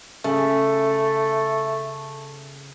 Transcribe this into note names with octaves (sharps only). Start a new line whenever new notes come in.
C#3 A3